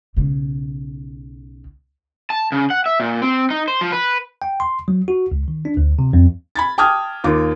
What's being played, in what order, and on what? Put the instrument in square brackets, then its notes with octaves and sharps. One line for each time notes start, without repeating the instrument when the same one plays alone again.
[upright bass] B1 C#3
[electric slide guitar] A5
C#3
F#5
E5
A#2
C4
D#4
C5
F3
B4
[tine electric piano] G5
C6
F#3
F#4
C#2
D#3
D4
D2
C3
F2
[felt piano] B5 G#6 A6
G5 A5 D6 D#6 F6 G#6
D#2 F4 D6